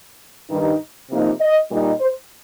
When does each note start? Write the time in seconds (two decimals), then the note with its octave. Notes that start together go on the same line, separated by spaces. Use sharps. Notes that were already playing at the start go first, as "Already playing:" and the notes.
0.50 G2 D#3 G3 D#4
1.10 C3 F3 A#3 D#4
1.40 D#5
1.71 A#2 G3 D#4
2.00 C5